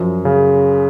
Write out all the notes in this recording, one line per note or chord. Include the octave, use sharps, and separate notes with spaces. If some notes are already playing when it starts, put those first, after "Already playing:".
Already playing: F#2 F3
C#3